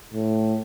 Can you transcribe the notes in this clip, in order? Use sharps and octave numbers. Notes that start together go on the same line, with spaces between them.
A2